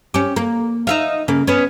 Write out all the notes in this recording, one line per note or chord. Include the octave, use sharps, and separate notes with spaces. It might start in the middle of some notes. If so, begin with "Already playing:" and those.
C#4 G4
A#3
D#4 E5 F5
C#3 A#3
B3 C#4